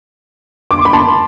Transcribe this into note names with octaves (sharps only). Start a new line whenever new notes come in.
D6
C6
B5
A5 C6